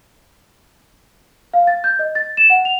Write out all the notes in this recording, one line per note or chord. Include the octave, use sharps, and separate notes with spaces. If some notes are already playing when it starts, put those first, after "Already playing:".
F5
A6
G6
D#5
A6
E7
F#5
F7